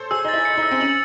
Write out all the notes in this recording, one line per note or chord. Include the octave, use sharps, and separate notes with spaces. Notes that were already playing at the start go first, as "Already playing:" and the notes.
Already playing: A4 C5 C#5
G#4 E6
D#4 A6
E4
C#7
D#4
E6
C4
C#4 F#7